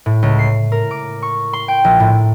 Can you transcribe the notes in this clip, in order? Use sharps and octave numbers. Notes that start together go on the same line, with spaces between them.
A2
C#2
C7
A#4
D6
C#6
C6
G5
A#1
A2